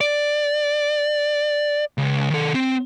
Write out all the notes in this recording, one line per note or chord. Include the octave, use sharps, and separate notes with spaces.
D5
C#2
D#3 A4
C4